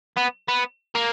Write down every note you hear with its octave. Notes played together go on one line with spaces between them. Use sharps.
B3
B3
A#3